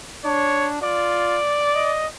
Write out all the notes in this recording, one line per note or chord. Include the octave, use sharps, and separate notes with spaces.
D4 C#5
F4 D5
D#5